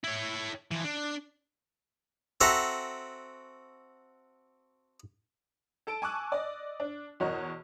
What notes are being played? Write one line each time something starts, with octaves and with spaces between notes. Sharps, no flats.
E4 C#5
E3 F3
D4
C4 F#4 A4 E5 A#5
A4 A5 D7
G#5 A5 C#6 D6 E6 F#6
D5 D#5
D4
E2 B2 F#4 A#4 C#5 D#5